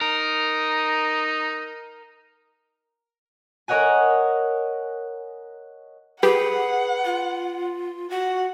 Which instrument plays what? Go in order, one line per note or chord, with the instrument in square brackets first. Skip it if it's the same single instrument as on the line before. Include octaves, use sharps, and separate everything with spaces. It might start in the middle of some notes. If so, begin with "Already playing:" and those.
[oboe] D#4 [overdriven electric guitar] A#4
[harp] A#4 C#5 D#5 F#5 G#5
[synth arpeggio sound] G4 [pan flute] G#4 [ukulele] B4 [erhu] F#5
[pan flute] F4
[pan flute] F#4 [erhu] F#5